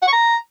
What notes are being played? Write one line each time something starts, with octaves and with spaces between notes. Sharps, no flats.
F#5
C#6
A#5